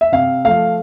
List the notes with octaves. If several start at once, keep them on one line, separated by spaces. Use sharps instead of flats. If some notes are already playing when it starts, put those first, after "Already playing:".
E5
C3 F5
F3 A3 F5